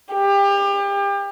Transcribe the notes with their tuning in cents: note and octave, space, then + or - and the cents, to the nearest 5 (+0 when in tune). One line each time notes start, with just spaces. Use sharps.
G4 +30